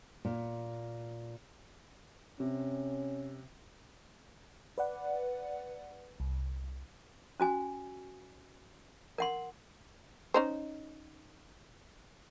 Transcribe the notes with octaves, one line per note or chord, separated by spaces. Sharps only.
A#2
C3 C#4
B4 D5 F#5
C2
C#4 F#4 G#5
A#4 F#5 C6
C#4 D#4 C5